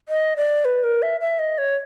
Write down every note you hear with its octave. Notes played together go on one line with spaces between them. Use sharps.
D#5
D5
B4
A#4
E5
E5
D#5
C#5